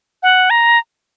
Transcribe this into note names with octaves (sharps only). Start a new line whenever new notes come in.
F#5
A#5